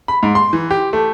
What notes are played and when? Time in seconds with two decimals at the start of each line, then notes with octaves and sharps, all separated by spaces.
0.08 B5
0.23 G#2
0.35 C6
0.53 E3
0.71 G4
0.93 A3